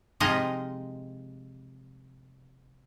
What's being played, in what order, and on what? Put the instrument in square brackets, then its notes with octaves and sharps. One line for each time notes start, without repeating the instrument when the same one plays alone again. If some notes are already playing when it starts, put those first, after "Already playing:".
[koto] C3 F3 G#3 D#4 F4 D#5